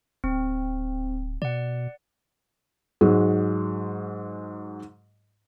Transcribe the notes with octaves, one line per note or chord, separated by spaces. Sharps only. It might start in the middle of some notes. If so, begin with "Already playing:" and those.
D1 C4
B2 D5 F#5
G#2 F#3 G#3